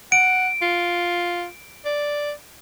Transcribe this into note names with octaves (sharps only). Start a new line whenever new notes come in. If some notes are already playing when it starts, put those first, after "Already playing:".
F#5 D7
F4
D5